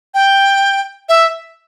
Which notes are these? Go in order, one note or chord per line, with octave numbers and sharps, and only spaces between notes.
G5
E5